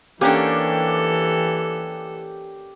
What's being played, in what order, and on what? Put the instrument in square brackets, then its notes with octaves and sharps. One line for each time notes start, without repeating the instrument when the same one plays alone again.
[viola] E3 A4 [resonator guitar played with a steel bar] A#3 C#4 D4 [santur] G4 F#5 G5